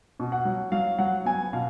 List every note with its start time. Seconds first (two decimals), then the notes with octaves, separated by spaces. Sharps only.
0.20 B2
0.32 F#5
0.45 F#3
0.72 F#3 F5
0.99 F#3 F#5
1.25 B3 G#5
1.53 B2 F5